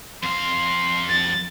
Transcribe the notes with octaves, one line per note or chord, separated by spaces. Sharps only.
F2 F5 C6
A6